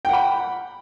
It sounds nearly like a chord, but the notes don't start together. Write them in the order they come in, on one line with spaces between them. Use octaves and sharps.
G5 F#5 B5